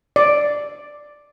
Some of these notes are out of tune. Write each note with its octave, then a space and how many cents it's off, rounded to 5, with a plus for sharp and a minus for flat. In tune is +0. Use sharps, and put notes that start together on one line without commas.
D5 +5